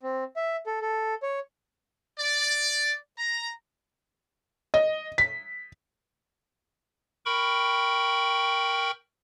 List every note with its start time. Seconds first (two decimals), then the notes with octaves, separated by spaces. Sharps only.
0.03 C4
0.36 E5
0.66 A4
0.82 A4
1.23 C#5
2.19 D5
3.18 A#5
4.74 D#5
5.18 B6
7.25 A#4 G5 B5 C#6